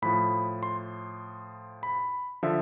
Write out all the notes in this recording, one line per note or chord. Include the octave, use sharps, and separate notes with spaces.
A2 F3 B5
C6
B5
D3 F3 E5